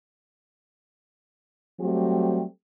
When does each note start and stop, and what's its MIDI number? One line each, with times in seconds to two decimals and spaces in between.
1.80 2.43 54
1.80 2.43 55
1.80 2.43 57
1.80 2.43 60
1.80 2.43 67